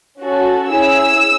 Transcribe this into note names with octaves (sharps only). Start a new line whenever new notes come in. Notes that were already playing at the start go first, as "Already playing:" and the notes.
C#4 F#4 A4
C#4 E4 G#4 E6